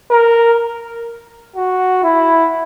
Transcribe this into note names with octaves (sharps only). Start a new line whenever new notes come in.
A#4
F#4
E4